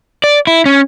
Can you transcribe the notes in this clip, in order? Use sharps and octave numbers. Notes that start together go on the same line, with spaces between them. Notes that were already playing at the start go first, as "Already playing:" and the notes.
D5
E4
C#4